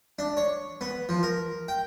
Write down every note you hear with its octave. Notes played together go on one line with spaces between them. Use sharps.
D4
C#5
B3
F3
A#4
G5